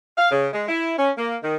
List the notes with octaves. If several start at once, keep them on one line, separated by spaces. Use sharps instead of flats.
F5
C#3
G#3
E4
C#4
A#3
D#3